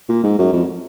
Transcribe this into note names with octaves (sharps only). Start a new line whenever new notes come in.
A#2
G#2
F#2
F2